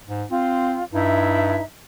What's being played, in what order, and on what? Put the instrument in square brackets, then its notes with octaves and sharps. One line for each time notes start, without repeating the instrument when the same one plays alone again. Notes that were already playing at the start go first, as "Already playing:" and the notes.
[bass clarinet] G#2
[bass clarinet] C4 [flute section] F4
[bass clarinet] G2 [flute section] D#4 E4 E5